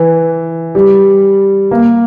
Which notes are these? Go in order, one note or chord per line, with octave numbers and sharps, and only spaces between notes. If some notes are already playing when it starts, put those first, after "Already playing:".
Already playing: E3
G3
A#3